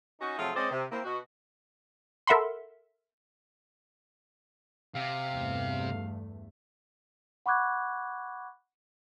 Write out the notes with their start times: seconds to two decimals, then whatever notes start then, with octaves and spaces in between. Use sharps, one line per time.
0.21 C#4 D#4 F#4
0.38 C3 F3 F#3 A3 F4 G#4
0.56 G#3 C4 C#4 C5 D5 D#5
0.71 C3
0.91 A#3 C4 E4
1.05 B2 F#4
2.27 A4 A#4 E5 F#5 B5 C6
4.95 C3 F5
5.32 E2 G2 A3
7.46 F#5 B5 C#6 D6 F#6 G#6